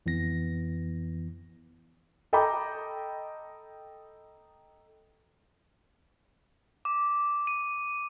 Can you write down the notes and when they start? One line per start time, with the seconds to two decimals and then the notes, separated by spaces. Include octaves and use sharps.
0.06 F2 E3 B3 A#6
2.33 A4 D#5 G5 A#5 B5 D6
6.85 D6
7.47 D#7